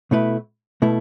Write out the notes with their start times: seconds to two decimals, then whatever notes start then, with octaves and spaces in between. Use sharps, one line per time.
0.11 B2 A3 E4 B4
0.82 B2 A3 E4